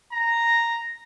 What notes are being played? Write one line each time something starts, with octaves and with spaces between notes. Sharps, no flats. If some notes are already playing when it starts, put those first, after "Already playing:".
A#5